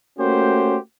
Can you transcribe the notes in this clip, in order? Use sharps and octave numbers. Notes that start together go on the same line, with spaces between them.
A3 A#3 C#4 F#4 G4 C5